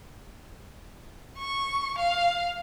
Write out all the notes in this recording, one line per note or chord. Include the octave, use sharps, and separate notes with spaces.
C#6
F5